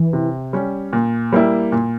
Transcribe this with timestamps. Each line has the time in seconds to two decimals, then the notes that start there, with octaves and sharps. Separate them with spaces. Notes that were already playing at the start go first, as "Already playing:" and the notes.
Already playing: E3
0.13 C3
0.53 G3 C#4
0.93 A#2
1.32 G3 A#3 E4
1.72 A#2